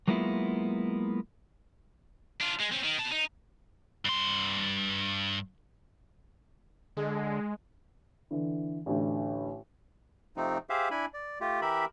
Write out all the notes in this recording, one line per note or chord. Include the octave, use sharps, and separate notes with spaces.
F#3 G#3 A#3 B3 E4 F4
D4 F4
G#3
C4 C#4
D#3
B2 A5
D#4
G2 C6
D3 G#3
D3 E3
A1 D2
C3 F3 A3 C4 D#4
G4 G#4 C5 E5 F5
D4 E4 G#5 B5
D5
A3 F4 G4
E3 G4 A#4 E5 B5